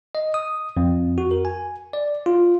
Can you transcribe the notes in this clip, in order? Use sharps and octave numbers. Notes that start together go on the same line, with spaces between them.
D#5
D#6
F2
F#4
A#4
G#5
D5
F4